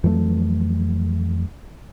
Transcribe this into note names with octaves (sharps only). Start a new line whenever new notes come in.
F2 E3 F#3 A3